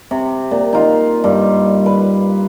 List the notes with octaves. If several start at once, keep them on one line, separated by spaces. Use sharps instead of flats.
C3
A#2
D#4 F4
G2
B4